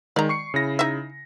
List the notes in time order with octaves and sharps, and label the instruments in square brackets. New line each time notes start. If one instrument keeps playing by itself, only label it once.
[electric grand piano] D#3 G#3 [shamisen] D5 A#5
[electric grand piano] C#6 C7 C#7
C#3 E4 A#6
[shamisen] D#4 E5